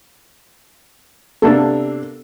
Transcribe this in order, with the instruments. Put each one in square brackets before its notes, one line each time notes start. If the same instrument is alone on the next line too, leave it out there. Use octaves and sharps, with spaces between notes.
[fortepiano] C3 A#3 D4 [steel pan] B3 A4